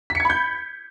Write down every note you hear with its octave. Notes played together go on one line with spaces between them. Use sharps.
B5 G6 G#6 B6 C#7